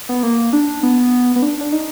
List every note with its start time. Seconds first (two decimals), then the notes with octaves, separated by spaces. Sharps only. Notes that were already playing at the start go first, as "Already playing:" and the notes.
0.09 B3
0.23 A#3
0.53 D4
0.83 B3
1.36 B3
1.42 D4
1.61 D4
1.72 D#4